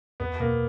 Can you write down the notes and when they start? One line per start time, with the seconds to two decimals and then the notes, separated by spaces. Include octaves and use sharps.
0.20 E2 B3
0.40 B2 A#3